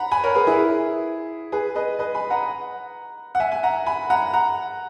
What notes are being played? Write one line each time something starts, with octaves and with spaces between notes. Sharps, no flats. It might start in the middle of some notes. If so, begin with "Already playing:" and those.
Already playing: F#5 A#5 B5
G#5 B5
A#4 C#5
G#4 B4
E4 G#4
G#4 B4
B4 D#5
B4 D#5
G#5 B5
F#5 A#5
F#5
E5 G#5
G#5
F#5 A#5
G#5 B5
F#5 A#5
F#5 A#5